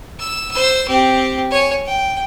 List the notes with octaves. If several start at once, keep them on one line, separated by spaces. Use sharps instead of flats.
E6
C5 E6
C4 G4
C#5 G#5
G5